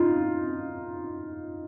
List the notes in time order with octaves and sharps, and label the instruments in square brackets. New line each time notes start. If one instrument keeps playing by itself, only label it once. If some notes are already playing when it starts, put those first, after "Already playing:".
Already playing: [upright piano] D#4 F4